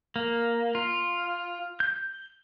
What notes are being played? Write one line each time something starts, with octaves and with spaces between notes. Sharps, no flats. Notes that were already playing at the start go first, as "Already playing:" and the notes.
A#3
F4
G6